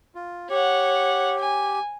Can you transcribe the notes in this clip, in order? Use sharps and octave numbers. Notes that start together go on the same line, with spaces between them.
F4
G4 C#5 F#5
G#5